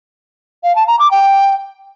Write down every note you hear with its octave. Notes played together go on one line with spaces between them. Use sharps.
F5
A5
A#5
D6
G5